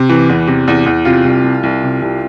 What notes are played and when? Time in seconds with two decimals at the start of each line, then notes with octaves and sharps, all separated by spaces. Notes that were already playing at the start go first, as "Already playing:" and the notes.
Already playing: C3
0.09 E3
0.29 E2
0.47 C3
0.68 E2
0.86 E2
1.05 C3 F4
1.25 C2
1.44 C2
1.63 C2
1.83 C3
2.02 C2